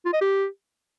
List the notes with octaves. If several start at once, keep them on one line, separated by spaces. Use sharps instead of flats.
F4
D#5
G4